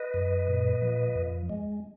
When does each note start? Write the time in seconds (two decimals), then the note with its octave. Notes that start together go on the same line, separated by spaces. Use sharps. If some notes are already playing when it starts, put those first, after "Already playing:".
Already playing: B4 D#5
0.14 F#2
0.48 A#2
0.82 F3
1.15 F2
1.49 G#3